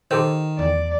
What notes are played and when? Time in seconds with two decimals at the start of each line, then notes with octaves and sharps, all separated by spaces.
0.11 D#3 G4 A4 C5
0.59 E2 D5